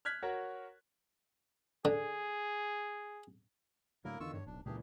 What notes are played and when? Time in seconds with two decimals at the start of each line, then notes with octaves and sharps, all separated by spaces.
0.05 F6 F#6 G#6 B6
0.22 F#4 A#4 C#5 F#5
1.85 D3 G#4
4.05 A2 D3 F#3 A#3 E4 A#4
4.20 E2 D3 D#3 F4 C#6 E6
4.34 G2 C#5
4.47 D1 B1 D4
4.66 C#2 A#2 D#3 E3 D4 G4 G#4